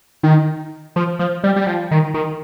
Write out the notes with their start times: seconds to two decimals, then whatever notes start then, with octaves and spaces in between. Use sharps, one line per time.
0.23 D#3
0.96 F3
1.19 F3
1.44 G3
1.56 G3
1.67 F3
1.91 D#3
2.14 D#3